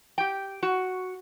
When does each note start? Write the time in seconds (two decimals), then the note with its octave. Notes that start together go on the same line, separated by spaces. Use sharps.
0.18 G4 G5
0.63 F#4